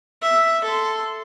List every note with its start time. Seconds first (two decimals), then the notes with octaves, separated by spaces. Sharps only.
0.22 E5
0.64 A4 C6